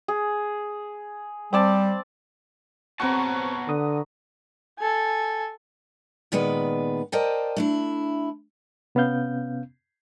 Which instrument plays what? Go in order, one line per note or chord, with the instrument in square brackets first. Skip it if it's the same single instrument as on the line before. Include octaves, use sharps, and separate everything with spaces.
[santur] G#4
[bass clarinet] G3 [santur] C4 D5 A5
[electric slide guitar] B3 C#5 A5 [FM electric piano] C4 C#6 [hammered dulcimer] F#4 B4 A#5
[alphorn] D3 [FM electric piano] D#6
[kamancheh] A4 G#5
[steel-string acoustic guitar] A#2 D#3 G#3 B3 B4 D5
A#4 C5 D5 D#5 G5 A5
A3 D4 E4
[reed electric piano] C3 B3 C#4 F5 G6